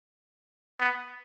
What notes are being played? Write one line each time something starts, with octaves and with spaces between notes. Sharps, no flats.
B3